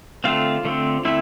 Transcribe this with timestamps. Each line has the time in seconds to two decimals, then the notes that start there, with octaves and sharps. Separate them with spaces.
0.24 D3 A3 C4 F4 F5
0.65 D3 A3 C4
1.05 D3 A3 C4 E4 E5